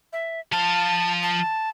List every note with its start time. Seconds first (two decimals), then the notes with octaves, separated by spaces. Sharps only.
0.13 E5
0.52 F3 F5 A5
1.23 A5